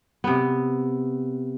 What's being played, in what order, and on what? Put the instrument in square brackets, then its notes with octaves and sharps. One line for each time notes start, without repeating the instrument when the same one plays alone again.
[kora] C3 B3